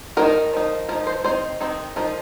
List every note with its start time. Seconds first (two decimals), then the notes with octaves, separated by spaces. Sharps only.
0.17 D#3 A#3 D#4 A#4
0.53 F3 D#4
0.89 F3 D#4 A#4
1.07 C5
1.24 D#3 C4 D#4 C5
1.61 D#3 C4 D#4
1.96 F3 D#4 A#4